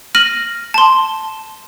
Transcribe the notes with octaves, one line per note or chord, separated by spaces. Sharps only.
F6 A#6 D#7 F#7
A5 C6